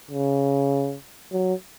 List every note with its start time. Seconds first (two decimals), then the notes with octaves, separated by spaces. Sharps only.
0.11 C#3
1.33 F#3